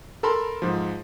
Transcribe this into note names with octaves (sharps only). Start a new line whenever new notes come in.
A4 A#4 A5 B5 C6
G#2 F3